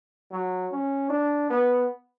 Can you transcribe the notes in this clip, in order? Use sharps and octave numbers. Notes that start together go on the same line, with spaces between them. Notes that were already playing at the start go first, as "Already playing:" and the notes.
F#3
C#4
D4
B3